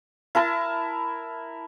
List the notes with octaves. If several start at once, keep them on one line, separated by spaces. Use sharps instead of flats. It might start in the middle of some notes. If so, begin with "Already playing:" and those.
E4 A#4 A5